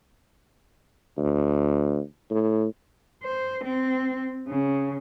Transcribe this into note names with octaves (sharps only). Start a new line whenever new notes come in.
D2
A2
C5
C4
C#3